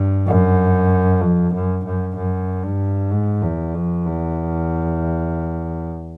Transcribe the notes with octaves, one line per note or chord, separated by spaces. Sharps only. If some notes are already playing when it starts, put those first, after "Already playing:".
Already playing: G2
F#2
F2
F#2
F#2
F#2
G2
G#2
E2
F2
E2